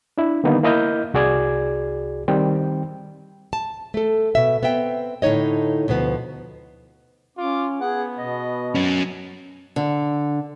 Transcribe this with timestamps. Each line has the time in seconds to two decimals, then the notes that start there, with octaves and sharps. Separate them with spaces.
0.18 D4 E4
0.44 D3 D#3 G3 A#3 B3 D#4
0.63 A#3 E4 D#5 F6 G6
1.14 C2 F#4 G#4 D5 G#6
2.28 D#3 G3 C4 G5
3.53 A5
3.94 A3 A4
4.35 B2 E5
4.63 B3 C4 E5 G5
5.22 A2 D3 D#4 C#5 D#5
5.88 D2 B2 F3 B3
7.37 C#4 F4 D6
7.81 B3 G#4 F#5
8.18 B2 D#5
8.75 F#3 C#4
9.76 D3